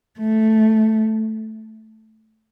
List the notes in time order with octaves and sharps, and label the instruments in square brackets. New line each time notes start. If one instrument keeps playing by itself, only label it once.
[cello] A3